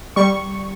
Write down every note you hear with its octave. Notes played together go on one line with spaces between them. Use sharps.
G3 C#6